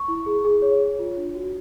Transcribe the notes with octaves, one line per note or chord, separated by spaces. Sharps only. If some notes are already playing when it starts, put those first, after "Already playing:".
Already playing: C#6
E4
G#4
G#4
C#5
C#5
F4
D4
F#4